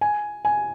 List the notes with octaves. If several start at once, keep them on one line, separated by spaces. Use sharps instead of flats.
G#5
G#5